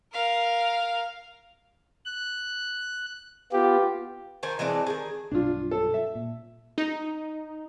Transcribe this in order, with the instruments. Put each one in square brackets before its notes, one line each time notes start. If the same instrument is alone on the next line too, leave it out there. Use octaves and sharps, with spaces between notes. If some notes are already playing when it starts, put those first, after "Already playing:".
[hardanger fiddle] A#4 F5
[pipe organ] F#6
[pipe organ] B3 F4 [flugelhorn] G4
[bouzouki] D#3 C5 G#5
E3 G#3 C4 D4
D#3 G#4
[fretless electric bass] B1 G2 [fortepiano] D4 F4
[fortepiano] A4
E5
[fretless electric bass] A#2
[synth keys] D#4